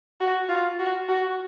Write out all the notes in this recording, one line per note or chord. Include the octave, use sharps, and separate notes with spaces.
F#4
F4
F#4
F#4